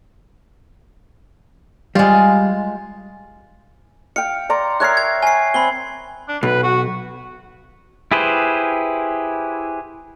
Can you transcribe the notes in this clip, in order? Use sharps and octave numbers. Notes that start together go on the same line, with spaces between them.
G3 G#3 F4
F5 G5 C#7
D5 A#5 C6
A#4 C#5 E5 F#6 C7
G#6
G#5 C7
C4 B5 G7
D4
B1 B4
F#4
E4 G4 G#4 B4 C5